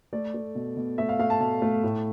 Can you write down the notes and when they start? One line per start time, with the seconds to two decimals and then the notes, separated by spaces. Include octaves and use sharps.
0.13 A3 D5
0.34 A3
0.55 B2
0.77 B2
0.98 A3 E5
1.09 F5
1.19 A3 F5
1.30 A5
1.40 B2 A5
1.62 A3
1.83 A2